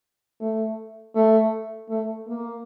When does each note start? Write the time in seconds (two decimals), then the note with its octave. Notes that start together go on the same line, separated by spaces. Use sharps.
0.40 A3
1.15 A3
1.89 A3
2.27 A#3